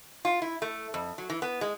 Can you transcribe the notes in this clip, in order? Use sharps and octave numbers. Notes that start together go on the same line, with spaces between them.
F4
E4
A3
F2
F#3
E3
B3
G#3